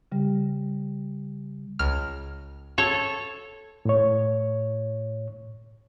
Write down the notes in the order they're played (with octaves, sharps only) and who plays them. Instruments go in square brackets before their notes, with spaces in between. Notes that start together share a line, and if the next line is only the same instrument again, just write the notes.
[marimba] C#3 G3 G4
[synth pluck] C#2 F6
[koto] A4 C#5
[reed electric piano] A2 C#5